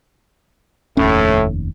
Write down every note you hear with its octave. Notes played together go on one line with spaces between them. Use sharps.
F1 D#2 A2 C#4